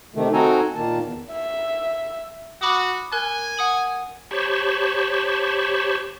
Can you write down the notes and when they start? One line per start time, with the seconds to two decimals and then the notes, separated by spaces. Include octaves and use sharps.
0.15 C3 D#3 A3
0.33 C4 D#4 F#4 A4 G#5 A#5
0.75 A#2 D#3 A#3 A5
1.00 E2
1.32 E5
2.62 F#4 B5 D6 D#6
3.12 A#4 G#5 F#6
3.57 F#5 D#6 F#7
4.31 G4 C5 C#5 A5 B5 C#6